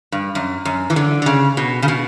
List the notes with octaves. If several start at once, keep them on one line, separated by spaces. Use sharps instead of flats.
G2
F#2
F#2
E3
D3
D3
C#3
B2
C#3
B2